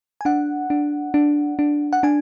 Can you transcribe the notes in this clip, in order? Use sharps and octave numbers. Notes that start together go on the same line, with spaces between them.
G#5
D4 F#5
D4
D4
D4
F#5
D4 G#5